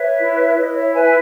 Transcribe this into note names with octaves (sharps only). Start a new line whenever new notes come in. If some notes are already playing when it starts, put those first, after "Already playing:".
Already playing: B4 C#5 E5
E4
E4 D#5
C#5 E5
B4 E5 G#5
G#5